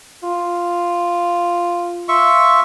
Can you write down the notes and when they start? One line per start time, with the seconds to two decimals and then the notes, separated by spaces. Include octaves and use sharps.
0.24 F4
2.08 F4 E5 C#6